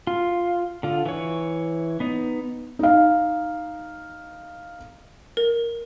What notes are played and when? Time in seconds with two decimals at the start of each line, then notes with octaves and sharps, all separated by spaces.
0.07 F4
0.83 D3 F4
1.06 E3 C#5
2.00 B3 D#4
2.79 D#4 F5
5.37 A#4